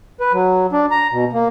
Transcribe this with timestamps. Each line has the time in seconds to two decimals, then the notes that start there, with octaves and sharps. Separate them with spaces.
0.20 B4
0.33 F#3
0.73 D4
0.91 A#5
1.11 B2
1.33 A#3